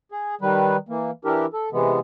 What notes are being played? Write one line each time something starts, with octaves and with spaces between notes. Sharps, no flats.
G#4
D#3 G3 B4
E3 A#3
E3 D4 E4 G4 A#4
A4
C3 E3 G#3 B3